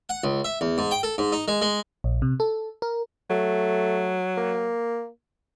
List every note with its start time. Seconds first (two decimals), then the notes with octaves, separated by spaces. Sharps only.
0.09 F#5
0.24 C#2
0.45 E5
0.61 E2
0.78 G#2
0.91 G5
1.03 A4
1.18 G#2
1.32 D#4
1.48 G#3
1.62 G#3
2.04 A#1
2.22 C3
2.40 A4
2.82 A#4
3.30 F#3 A3
4.37 A#3